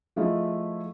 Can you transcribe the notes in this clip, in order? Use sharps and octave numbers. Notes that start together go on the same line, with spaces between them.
F3 A3 E4 F4 G#4 D#5